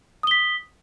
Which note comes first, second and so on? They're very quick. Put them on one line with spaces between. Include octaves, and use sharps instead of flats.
D#6 G7 B6